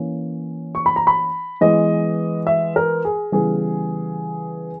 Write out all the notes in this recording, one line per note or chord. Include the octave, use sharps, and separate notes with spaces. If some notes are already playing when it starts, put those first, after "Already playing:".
Already playing: E3 A#3 C#4
C#6
B5
A#5
B5
E3 G#3 B3 D#5
E5
A#4
G#4
C#3 E3 G3 B3 G#4